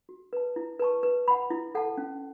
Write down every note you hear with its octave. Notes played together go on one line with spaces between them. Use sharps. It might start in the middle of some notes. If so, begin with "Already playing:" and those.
F#4
B4 A5
E4
B4 A5 C#6
B4
F#5 B5
E4
A4 F#5 A5
C#4